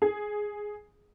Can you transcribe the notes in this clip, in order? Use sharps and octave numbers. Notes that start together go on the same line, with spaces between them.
G#4